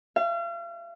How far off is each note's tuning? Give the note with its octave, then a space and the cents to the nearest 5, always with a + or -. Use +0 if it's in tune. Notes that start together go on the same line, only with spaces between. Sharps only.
F5 -40